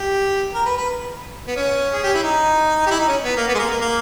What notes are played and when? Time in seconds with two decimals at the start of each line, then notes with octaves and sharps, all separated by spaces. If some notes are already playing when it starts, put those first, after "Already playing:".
Already playing: G4
0.54 A#4
0.66 B4
0.77 B4
1.47 B3
1.56 C#4
1.93 G#4
2.04 G4
2.14 E4
2.23 D#4
2.86 G4
2.90 E4
2.99 D#4
3.08 C#4
3.24 B3
3.37 A#3
3.48 B3
3.54 G#3
3.59 A#3
3.69 A#3
3.81 A#3